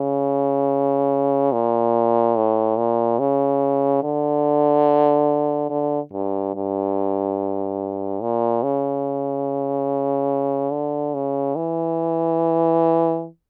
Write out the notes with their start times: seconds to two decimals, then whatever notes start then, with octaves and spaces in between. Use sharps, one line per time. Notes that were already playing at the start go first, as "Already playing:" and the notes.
Already playing: C#3
1.53 A#2
2.36 A2
2.77 A#2
3.19 C#3
4.03 D3
5.70 D3
6.13 G2
6.55 G2
8.22 A#2
8.63 C#3
10.72 D3
11.14 C#3
11.56 E3